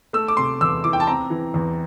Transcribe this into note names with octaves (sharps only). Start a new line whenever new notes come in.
A3 E6
D6
C3 C6
E2 E6
E3 D6
G5
A5
C4 A#5
E3
E2